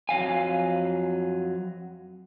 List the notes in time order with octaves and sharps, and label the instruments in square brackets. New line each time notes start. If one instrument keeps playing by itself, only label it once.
[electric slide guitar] F2 F#3 F5 G#5